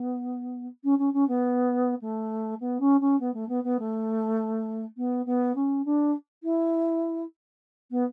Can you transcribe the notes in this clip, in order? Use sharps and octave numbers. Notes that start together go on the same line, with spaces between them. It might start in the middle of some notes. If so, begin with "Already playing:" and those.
Already playing: B3
C#4
C#4
C#4
B3
A3
B3
C#4
C#4
B3
A3
B3
B3
A3
B3
B3
C#4
D4
E4
B3